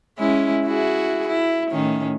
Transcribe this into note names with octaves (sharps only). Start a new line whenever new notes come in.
G#3 C#4 E4
E4 F#4 G#4
E4
A2 D#3 C#4